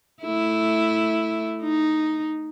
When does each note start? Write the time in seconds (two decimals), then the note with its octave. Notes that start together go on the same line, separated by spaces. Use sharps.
0.23 A3 E4
1.62 D#4